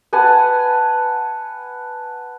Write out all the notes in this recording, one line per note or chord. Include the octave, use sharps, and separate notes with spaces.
B4 F#5 G#5 A5